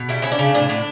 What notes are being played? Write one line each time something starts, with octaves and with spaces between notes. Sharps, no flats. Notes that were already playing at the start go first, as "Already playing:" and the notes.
Already playing: B2
G3 E4
C#4 E4
D4
C#3
A2 D4
A2 D4